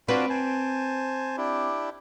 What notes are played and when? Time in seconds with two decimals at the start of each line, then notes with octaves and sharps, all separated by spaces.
0.08 C4 D4 F4 F#4 B4
0.30 C5 G#5 A5
1.37 D4 E4 G4